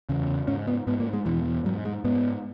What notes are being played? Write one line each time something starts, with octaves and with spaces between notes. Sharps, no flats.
E2 C#3
G#2 C#4
B3
G#2 B3
A#3
G#3
E2 B2 E3
G#2 F#3
G#3
G#2 B3